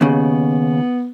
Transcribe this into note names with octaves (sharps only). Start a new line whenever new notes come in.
D#2 C#3 B3